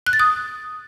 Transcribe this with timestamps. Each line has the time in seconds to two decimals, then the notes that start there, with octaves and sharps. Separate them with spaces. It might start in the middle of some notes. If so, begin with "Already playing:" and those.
0.07 F#6
0.13 A6
0.20 D#6